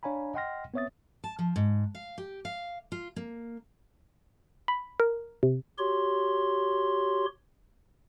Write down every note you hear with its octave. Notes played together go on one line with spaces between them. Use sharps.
D4 C#5 F5 G#5 A#5 B5
D#5 F#5 G5 C6 F6 A#6
B3 C4 C#5 E5 D#6 A6
A5
F3
G#2
F5
G4
F5
F4
A#3
B5
A#4
C3
F#4 G4 C#5 C6